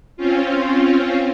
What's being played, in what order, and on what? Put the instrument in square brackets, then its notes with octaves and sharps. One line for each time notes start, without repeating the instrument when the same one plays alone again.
[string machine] C4 C#4 F4